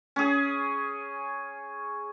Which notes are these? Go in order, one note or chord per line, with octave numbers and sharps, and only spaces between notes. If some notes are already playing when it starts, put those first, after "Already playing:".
C#4 G#4